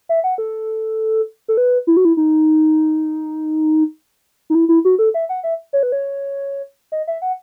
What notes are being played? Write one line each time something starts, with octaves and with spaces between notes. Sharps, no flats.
E5
F#5
A4
A4
B4
E4
F#4
E4
D#4
D#4
E4
E4
F#4
A4
E5
F#5
E5
C#5
B4
C#5
D#5
E5
F#5